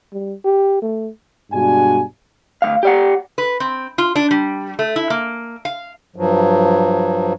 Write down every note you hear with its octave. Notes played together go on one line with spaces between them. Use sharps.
G3
G4
A3
G2 B2 G#3 D4 F#4 G#5
D2 G#2 F5
G4 D5 F#5
B4
C4
F4
D4
G3
A3
E4
A#3
F5
G2 F3 F#3